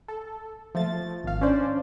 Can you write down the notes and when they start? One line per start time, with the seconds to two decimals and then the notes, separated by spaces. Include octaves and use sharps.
0.08 A4
0.75 F3 A3 A6
1.24 G#1 F5
1.41 C#4 D4 C5 D5